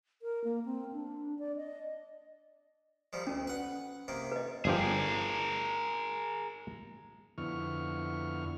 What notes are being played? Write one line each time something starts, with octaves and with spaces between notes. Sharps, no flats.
A#4
A#3
C4
D4
D5
D#5
D#3 F3 G3
D2 C#4
B4 F#5
C3 D#3 A#3
B4 D#5
G1 F3 G4 G#4 A#4
F2 D3 B3 E4 C#6 F6